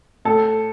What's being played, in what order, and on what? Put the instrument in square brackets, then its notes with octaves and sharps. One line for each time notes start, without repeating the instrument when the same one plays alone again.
[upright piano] A2 A4